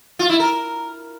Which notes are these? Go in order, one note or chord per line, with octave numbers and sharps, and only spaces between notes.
F4
E4
A#4